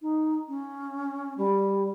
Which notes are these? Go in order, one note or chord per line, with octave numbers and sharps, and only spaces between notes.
D#4
C#4
G3